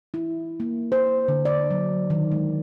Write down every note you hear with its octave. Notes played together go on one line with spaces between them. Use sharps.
E4
A#3
C5
D3
D5
F#3
D#3
G#3